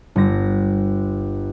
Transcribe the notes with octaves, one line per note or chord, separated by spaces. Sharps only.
G1 A#6